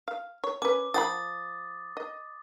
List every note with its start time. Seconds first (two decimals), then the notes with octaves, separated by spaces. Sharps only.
0.08 F5
0.44 C#5
0.62 C#4 B4 D6
0.94 F3 G5 B5 D#6 A6
1.97 D#5